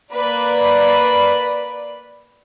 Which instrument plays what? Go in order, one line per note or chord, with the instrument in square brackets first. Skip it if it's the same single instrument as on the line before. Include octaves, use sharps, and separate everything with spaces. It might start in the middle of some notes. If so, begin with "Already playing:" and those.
[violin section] A#3 B4 D5 B5